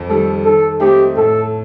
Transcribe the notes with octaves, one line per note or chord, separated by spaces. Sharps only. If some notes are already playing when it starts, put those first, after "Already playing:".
Already playing: F2
D#3 G3 A4
D#3 A4
A3 C4 D#4 G4
A2 A4